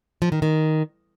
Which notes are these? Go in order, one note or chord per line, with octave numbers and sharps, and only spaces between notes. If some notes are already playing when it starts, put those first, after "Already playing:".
F3
D#3
D#3